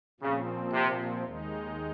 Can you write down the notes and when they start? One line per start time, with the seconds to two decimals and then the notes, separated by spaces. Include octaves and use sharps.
0.20 A#2 C#3 F3 C4
0.72 C3
1.24 D#2 D#3 G#3 D#4